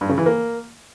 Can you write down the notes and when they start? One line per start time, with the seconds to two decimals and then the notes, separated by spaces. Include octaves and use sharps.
0.01 G2
0.09 C#3
0.18 E3
0.26 A#3